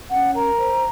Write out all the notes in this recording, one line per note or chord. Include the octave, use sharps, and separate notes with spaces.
C#4 F#5
A#4 A#5
C5